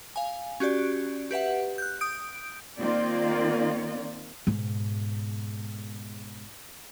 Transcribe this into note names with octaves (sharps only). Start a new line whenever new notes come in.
F5 G#5
C#4 F#4 G4 D5
G4 B4 E5 F#5
F#6 G6
D#6 G6 D7
D#3 A#3 C4 F4 D5
G#2 B2